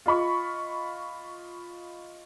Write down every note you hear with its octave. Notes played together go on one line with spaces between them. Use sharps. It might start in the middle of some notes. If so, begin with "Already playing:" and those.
F4 D#5 B5 C#6